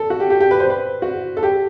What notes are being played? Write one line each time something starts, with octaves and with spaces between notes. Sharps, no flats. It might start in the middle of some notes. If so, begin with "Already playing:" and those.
Already playing: A4
F#4
G4
G4
G4
B4
C5
B4
F#4
A4
G4